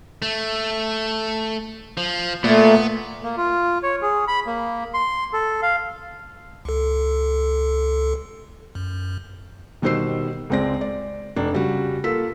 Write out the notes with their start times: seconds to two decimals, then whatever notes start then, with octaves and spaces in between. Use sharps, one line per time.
0.22 A3
1.97 F3
2.44 A#2 A3 B3
3.24 A#3
3.37 F4
3.83 C#5
4.02 G#4
4.28 B5
4.47 A#3
4.94 C6
5.33 A4
5.62 F5
6.65 C#2 A4
8.75 F#2
9.82 B2 D#3 G3 C5 E6 C7
10.50 C#2 G#3 C4 D5 A#6
10.81 D5
11.36 F1 D4
11.53 C#3 G3 F#4
12.04 A#3 F4 A4 E6 B6